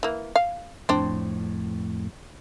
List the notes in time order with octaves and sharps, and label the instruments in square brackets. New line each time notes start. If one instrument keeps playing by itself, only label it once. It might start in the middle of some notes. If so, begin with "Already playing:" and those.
[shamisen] E3 A#3
F5
[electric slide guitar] F2 A2 [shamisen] C4 D4